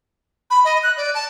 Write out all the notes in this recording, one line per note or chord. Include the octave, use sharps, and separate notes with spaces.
B5
D#5
F#6
D5
A5